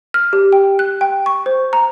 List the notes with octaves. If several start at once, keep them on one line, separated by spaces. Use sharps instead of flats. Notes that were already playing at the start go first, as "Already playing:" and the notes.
F6
G4
G5
F#6
G5
C#6
C5
A#5